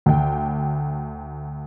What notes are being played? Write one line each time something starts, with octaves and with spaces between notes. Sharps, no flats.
D2 G5